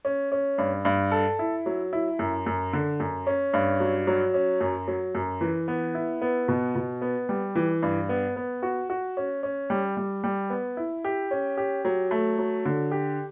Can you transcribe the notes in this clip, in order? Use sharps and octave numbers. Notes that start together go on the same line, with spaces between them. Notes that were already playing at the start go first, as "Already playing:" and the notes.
C#4
C#4
G2
G2
A4
E4
F#3
E4
F#2
F#2
D3
F#2
C#4
G2
F#3
F#3
C#4
F#2
F#3
F#2
E3
B3
E4
B3
B2
B2
B3
G3
E3
G2
B3
B3
F#4
F#4
C#4
C#4
G3
G3
G3
B3
E4
G4
C#4
G4
F#3
A3
F#3
D3
G4